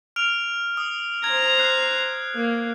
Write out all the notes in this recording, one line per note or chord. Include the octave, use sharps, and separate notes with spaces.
F6 D7 F7
D#6
C5 A#5 G#6
F#6 C7
A#3